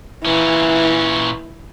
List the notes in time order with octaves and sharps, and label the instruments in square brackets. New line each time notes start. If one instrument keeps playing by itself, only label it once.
[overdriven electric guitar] A#2 C#4 [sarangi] E3